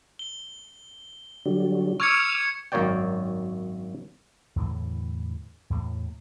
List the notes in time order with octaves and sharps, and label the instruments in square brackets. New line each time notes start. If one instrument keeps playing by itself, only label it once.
[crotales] G7
[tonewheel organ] D3 F#3 G3
[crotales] C#6 G#6 C#7 [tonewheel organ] D6 E6 F6
[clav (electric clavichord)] G#1 F#2 A#3 C#5 D5 G5
[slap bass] E2 A2 D3 E3
E2 A2 A#3